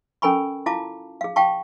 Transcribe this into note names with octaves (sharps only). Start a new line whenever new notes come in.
C#4 A4 A#4 G#5 B5 C#6
E4 F4 F5 A5 D6
G#4 F5
F5 G5 A5 C#6